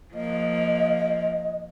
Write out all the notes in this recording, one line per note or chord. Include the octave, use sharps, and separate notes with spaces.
F3 A#3 D#5